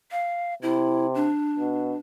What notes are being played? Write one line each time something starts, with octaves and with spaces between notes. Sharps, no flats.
F5
C3 E4
D4
B2